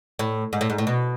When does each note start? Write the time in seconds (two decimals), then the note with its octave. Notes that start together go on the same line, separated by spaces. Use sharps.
0.19 A2
0.53 G#2
0.61 A2
0.70 G#2
0.78 A2
0.87 B2